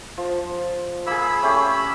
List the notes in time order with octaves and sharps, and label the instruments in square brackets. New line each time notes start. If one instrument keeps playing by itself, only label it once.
[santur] F3
[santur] A#3 G#4 [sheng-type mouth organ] B5 E6
[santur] A3 C#4 G4